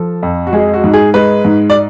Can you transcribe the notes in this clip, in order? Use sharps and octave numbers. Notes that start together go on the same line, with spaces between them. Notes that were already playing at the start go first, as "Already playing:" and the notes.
Already playing: F3 A4
F2
F#4
G#3 G#4
F#4
G#2
G#4
G#3 B4
G#2
D5